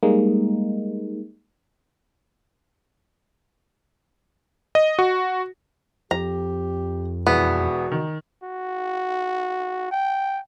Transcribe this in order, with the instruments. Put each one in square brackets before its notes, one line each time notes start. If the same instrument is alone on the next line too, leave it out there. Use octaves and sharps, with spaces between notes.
[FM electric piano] G3 G#3 A#3 D#4
[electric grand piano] D#5
F#4
[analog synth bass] F2 [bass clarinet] G4 [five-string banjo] A#5
[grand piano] E1 E3 [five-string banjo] B3 [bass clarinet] F#4
[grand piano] D#3
[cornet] F#4
G5